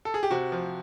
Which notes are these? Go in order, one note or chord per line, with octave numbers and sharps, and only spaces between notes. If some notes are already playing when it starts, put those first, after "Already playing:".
A4
G#4
G4
C3 F#4
F3